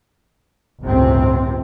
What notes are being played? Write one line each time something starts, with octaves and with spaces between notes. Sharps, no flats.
G1 C#2 A2 C3 C4